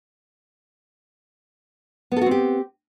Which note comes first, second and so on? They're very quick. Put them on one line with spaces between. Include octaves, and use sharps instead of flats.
B3 A4 F#4 C4 G4